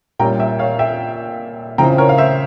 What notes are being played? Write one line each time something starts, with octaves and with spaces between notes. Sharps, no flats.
A#2 G3 C#4 G5 A#5
E5 G5
C#5 F5
E5 G5
C#3 F3 C4 E4 G5 A#5
A#4 C#5
F5
C5 E5